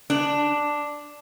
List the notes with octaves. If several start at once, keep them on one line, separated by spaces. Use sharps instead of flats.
D4